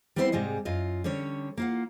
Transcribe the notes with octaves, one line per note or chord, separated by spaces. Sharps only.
G3 B3 C4 E4 A#4 C5
G#2 C3 G3 G#3 D#5
F#2 F4 D#5
D3 G3 C#4 C#5
A#3 F4 F#5